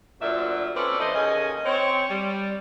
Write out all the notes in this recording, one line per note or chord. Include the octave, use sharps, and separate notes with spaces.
D2 A#2 F#3 D5 E5
C4 C#4 A4 B4 D5
E3 A3 C5 D#5
D#2 C#4 G#4 D#5
C4 C#5
G3